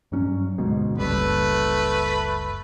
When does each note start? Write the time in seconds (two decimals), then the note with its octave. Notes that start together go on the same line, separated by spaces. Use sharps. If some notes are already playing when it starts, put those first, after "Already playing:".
0.12 G2 F#3 C#4
0.58 D2 G#2 B2
0.98 F#1 C#2 G3 A3 B4 B5